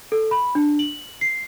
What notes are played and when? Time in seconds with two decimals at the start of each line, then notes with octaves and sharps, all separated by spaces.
0.12 A4
0.31 B5
0.55 D4
0.79 F#7
1.21 C7